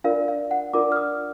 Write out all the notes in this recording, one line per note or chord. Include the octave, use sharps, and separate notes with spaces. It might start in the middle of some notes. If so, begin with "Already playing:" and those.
D4 F4 A#4 D5 F5
F5
F#5
D4 F4 A#4 D5 D6
F6
D#6